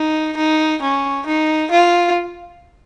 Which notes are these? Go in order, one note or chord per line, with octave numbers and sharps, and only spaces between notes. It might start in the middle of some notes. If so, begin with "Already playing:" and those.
Already playing: D#4
D#4
C#4
D#4
F4